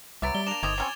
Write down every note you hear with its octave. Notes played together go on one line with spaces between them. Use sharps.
C2 F#3 B3 E5 D6 A6 D7
G3 G7
A#3 D4 A5 A#5 E7 F7
G1 D#3 A3 C4 D#5 D6 G#6 F7
F#3 C4 C#4 A#4 C#5 G#5